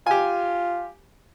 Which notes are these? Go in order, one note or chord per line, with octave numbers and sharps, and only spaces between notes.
F4 G4 G#5